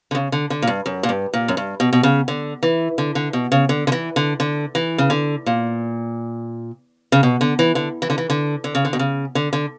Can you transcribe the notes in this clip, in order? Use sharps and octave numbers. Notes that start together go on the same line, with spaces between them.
D3
C#3
D3
D3
A#2
G2
F#2
A#2
G2
A#2
F#2
G2
B2
B2
C#3
D3
E3
D3
D3
B2
C#3
D3
D3
E3
D3
D3
E3
C#3
D3
A#2
C#3
B2
D3
E3
D3
E3
D3
E3
D3
D3
C#3
D3
B2
C#3
D3
D3